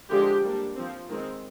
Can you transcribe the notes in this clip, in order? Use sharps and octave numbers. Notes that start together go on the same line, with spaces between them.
D3 F3 G#3 D4 G4
G3 A#3 D4
F3 C4
D#3 G#3 C4